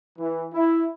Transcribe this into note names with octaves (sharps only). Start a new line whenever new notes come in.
E3
E4